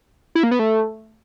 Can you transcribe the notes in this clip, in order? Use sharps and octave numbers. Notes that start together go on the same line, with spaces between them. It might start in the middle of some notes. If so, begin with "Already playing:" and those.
E4
A#3
B3
A3